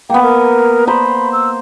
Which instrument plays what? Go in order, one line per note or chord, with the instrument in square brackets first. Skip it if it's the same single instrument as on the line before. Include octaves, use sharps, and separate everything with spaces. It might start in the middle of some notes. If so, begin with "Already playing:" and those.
[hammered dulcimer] A#3 B3 [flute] G5
[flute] A#4
[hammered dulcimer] C5 A#5 [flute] B5
[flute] E6